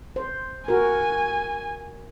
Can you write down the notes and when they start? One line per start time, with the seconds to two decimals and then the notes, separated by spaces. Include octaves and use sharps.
0.16 C5
0.68 F#4 A#4 G#5